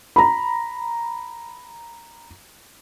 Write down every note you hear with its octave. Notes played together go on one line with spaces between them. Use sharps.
A#5 B5